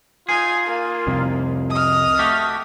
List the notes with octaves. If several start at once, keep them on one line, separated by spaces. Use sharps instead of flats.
D#4 F4 G#4 G#5
A#3
C2 F2 C3
D#5 D#6 F6
A3 F#4 G4